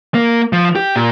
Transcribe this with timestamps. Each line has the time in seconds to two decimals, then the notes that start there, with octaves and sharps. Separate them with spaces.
0.14 A#3
0.53 F3
0.76 G4
0.96 A#2